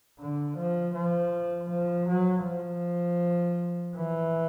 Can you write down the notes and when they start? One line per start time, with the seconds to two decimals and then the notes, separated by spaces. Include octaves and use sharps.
0.19 D3
0.57 F3
0.95 F3
1.70 F3
2.08 F#3
2.46 F3
3.97 E3